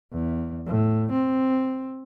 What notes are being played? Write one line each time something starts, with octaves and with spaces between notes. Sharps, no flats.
E2
A2
C4